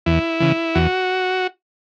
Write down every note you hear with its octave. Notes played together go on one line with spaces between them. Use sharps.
E2 E4
C#3 E3
E2 F#4